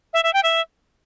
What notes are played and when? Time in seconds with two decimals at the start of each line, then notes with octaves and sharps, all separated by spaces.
0.13 E5
0.23 E5
0.33 G5
0.43 E5